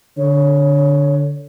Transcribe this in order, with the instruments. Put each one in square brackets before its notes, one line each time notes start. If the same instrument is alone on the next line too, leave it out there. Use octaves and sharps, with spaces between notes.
[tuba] D3 [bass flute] C#5